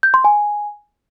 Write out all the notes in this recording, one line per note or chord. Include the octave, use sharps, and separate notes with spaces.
G6
C6
G#5